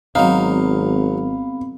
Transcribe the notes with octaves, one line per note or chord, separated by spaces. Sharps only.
G#1 F#3 B3 C4 D#4 F5 B5